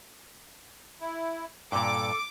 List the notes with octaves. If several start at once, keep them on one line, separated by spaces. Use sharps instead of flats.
E4
G2 A#2 A4 D6